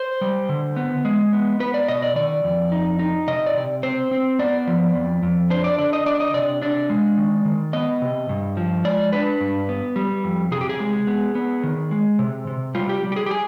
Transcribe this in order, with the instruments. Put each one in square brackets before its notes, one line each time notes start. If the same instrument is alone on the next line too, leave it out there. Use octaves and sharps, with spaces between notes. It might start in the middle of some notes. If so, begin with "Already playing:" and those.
Already playing: [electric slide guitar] C5
G3
D3
B3
G#3
B3
B3 B4
D5
B2 D#5
D5
D#3 D5
F2
D#4
D#4
C3 D#5
D5
C3
C4 C5
C4
B3 D5
F3
F2
F2
D4 C5
D5
D3 D5
D#5
D4 D5
D#5
C3 D5
D4 D5
G#3
D#3
D#3
B3 D#5
C3
G2
F3
G#3 D5
D4 B4
G2
B3
G3
F2
C3 G#4
G4
G#4
G#3
B3
B3
D#3
G#3
C3
C3
G3 F4
G4
G3
G4
G#4
G4
G#4